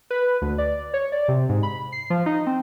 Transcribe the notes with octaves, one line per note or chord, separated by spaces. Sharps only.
B4
D2
D5
C#5
D5
C3
G#2
B5
C7
F3
D#4
C4